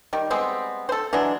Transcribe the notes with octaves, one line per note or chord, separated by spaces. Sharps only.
D#3 G3
G3 G#3 B3 C4
A4 C5
E3 F#3 G#3 D4